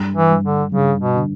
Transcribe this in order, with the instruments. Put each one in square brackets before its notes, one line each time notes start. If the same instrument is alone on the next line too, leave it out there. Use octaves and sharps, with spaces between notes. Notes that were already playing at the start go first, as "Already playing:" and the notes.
Already playing: [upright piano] G2
[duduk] E3
[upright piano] G2
[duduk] D3
[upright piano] G2 [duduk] C#3
[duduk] B2
[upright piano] D3